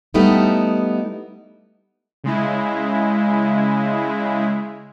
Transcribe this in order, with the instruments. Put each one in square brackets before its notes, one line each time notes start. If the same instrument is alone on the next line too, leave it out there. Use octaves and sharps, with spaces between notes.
[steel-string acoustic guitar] G3 A3 B3 D#4 E4
[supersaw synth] C#3 G#3 E4